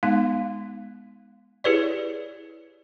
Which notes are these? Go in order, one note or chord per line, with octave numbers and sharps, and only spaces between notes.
G#3 B3 D#4 F5
E4 G4 G#4 B4 C#5 D5